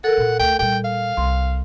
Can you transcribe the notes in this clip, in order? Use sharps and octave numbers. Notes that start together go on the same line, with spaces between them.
A4 A#4 F#5
A#2
D2 G5
A#2 G3 G5
F5
C2 C6